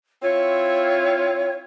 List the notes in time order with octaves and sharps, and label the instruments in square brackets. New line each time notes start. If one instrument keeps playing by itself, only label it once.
[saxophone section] C4 E4 F4 [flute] C#5